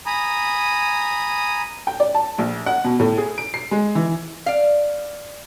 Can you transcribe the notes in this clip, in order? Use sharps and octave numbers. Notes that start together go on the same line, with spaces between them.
G#5 A#5 B5 D#6
G5
D5
A5
A#1
F#5
B2
A2
G#4
D7
C7
G#3
E3
D5 F5